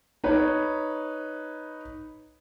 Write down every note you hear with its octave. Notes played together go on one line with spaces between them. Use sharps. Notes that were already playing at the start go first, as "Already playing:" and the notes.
D#4 B4 C#5